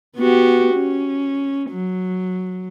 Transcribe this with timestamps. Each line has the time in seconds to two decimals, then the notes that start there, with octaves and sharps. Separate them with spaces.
0.17 B3 F#4 G4
0.75 C#4
1.71 F#3